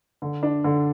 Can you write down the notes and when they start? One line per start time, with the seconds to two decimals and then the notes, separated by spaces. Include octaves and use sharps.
0.22 D3
0.43 D4
0.64 D3